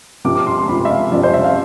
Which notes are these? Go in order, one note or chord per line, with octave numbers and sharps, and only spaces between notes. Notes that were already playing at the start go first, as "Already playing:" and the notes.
C3 F3 D6
D6
C6
C6
C3 F3 B5
E5
F5
C3 F3 D5
C5
E5
F5